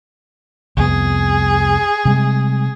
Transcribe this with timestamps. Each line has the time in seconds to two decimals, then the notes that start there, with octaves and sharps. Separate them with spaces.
0.77 C2 F2 B3 G#4
2.05 C3 G3 G#3